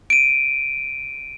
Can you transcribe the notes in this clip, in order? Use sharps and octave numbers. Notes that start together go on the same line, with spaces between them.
D7 D#7